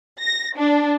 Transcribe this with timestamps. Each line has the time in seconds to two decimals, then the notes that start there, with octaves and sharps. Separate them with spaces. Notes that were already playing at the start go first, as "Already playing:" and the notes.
0.21 A#6
0.55 D4